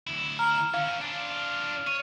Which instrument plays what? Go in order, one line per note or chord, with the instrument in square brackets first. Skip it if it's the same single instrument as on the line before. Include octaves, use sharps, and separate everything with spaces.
[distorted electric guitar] D2 E4
[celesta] A#5 [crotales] F6
[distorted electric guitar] E3 C#4 [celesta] F5
[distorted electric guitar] D4 F4
[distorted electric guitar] C#5 [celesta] D#7